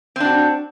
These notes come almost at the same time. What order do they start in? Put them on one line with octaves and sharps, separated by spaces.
C4 D4 F#4